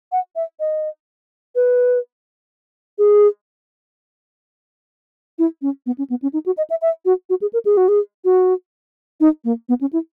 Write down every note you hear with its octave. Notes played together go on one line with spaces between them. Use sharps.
F#5
E5
D#5
B4
G#4
E4
C#4
B3
C#4
B3
C#4
D#4
F#4
D#5
E5
E5
F#4
F#4
G#4
A#4
G#4
F#4
G#4
F#4
D#4
A#3
B3
C#4
E4